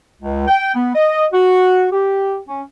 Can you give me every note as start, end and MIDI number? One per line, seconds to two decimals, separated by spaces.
0.21 0.45 37
0.48 0.75 79
0.75 0.93 59
0.95 1.25 75
1.33 1.87 66
1.92 2.38 67
2.48 2.62 61